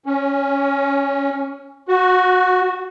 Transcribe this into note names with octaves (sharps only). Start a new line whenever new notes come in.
C#4
F#4